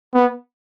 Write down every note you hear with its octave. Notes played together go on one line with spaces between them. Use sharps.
B3